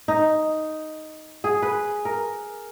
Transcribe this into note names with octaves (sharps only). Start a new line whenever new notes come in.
D#4
G#4
B4
A#4